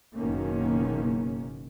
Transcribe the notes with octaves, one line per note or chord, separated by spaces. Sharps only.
F#1 B2 D#3 A#3 C#4